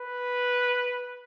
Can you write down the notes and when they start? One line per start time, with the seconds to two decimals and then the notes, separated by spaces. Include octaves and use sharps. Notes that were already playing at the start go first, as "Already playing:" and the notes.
Already playing: B4